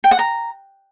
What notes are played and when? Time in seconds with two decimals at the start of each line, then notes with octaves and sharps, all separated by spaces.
0.04 G5
0.11 F#5
0.19 A#5